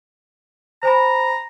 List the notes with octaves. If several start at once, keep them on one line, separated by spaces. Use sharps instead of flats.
C5 G#5 A#5 B5